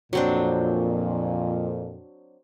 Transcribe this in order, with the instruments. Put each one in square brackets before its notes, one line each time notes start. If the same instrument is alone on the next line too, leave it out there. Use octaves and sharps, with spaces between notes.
[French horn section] F2 A#2 [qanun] F#3 C4 D4